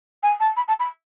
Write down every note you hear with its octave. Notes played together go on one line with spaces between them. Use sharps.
G#5
A5
B5
A5
B5